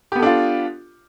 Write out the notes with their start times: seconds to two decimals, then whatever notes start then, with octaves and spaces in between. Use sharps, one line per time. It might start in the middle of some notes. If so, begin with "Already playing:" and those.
0.12 G4
0.15 B3
0.19 A4
0.22 D4
0.26 F4